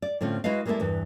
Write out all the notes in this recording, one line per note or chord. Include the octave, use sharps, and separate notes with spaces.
D5
A2 D3 C4 C#4 F4
G#3 E4 F#4 B4 D#5 F5
G3 G#3 A#3 B3 E4 A4
E2 G2 E3